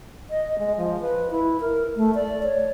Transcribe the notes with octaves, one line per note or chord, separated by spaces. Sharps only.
D#5
G#3
F3
B4
E4
A#4
A3
D5
C#5